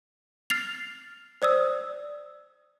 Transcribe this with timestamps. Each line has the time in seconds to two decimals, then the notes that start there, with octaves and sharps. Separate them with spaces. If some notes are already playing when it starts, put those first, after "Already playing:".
0.50 F6 A6 C7 F7
1.42 C5 D5 D#6 E6